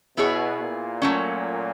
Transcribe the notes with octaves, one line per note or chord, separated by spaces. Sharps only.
B2 B3 E4 G#4 C#5
A#2
F#3 A3 C#4